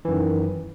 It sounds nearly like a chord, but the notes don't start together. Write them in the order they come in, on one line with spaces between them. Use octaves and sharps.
E3 F#2 D#3